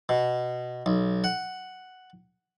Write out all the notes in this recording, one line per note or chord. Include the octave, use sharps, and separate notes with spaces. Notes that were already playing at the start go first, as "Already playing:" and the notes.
B2
B1
F#5